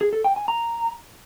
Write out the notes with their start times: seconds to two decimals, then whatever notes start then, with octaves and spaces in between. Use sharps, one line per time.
0.01 G#4
0.13 A4
0.24 G5
0.36 G#5
0.48 A#5